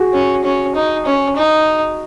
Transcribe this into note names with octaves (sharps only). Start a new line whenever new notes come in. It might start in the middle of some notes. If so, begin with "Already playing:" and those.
Already playing: F#4 G#4
C#4
C#4
D#4
C#4
D#4